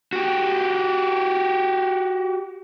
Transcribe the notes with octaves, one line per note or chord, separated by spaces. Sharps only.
F#4 G4